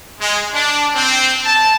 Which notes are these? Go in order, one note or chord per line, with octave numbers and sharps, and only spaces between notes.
G#3
D4
C4
A5